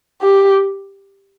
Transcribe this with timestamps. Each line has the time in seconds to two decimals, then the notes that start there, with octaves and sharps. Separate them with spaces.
0.22 G4